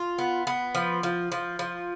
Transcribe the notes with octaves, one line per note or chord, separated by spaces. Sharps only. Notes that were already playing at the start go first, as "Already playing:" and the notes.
Already playing: F4
B3
B3
F3
F3
F3
F3